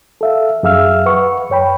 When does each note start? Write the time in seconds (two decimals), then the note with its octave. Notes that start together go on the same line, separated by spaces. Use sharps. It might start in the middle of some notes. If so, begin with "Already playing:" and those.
0.21 A4 E5 F5
0.63 F#2 G#4 E5 F5 E6 F6
1.06 B4 F#5 C#6
1.50 F#2 C#5 G5 B5